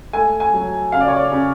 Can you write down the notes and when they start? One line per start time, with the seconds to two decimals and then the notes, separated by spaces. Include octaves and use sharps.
0.13 A3 G#5
0.40 G#5
0.53 F#3
0.92 C#3 F5
1.00 D5
1.08 C#5
1.16 D5
1.32 C#3